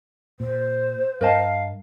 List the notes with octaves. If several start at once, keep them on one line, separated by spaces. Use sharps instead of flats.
A#2 C5
G2 A#4 D#5 F5 A5